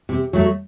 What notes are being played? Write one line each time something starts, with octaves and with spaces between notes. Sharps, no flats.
C3
F#3 A3